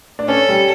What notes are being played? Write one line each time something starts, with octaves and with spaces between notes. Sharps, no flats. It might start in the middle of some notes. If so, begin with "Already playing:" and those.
D4
C#4 A4
G3